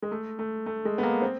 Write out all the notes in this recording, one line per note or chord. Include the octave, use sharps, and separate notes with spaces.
G#3
A3
A3
A3
G#3
B3
A#3
C4